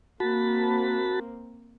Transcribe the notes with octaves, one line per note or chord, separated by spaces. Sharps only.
A#3 C4 F#4 A5 B5